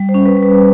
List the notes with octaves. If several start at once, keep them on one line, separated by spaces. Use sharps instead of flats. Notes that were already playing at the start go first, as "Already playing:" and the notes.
Already playing: G3
C5
C#4
B4
G3
B4